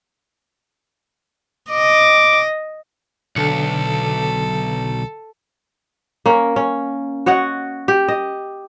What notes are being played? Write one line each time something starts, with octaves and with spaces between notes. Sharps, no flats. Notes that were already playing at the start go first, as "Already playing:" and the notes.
D#5 D6
B1 D3 A4 C#7
A#3 C#4
C#4
F#4 C#5 D#5 F#5
G4
D#5